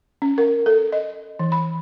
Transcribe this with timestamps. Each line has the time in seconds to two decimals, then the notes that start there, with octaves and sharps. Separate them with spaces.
0.22 C#4
0.38 A#4
0.66 A4
0.92 D#5
1.39 E3
1.52 B5